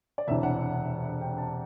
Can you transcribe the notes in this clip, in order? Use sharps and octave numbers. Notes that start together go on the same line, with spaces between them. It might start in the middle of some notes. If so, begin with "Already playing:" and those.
D5
E1 D2 C3 E3 E5
F#5
G5
A5